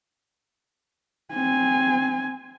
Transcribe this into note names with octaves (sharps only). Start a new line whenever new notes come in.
C4 G#5